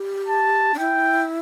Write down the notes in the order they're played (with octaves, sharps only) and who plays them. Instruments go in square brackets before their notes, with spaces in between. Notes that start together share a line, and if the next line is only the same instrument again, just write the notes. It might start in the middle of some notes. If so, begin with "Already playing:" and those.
Already playing: [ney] G4
[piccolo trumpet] A5
[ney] D4
[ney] E4 [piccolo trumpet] G5